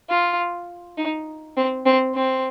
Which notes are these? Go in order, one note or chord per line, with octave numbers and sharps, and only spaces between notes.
F4
D#4
C4
C4
C4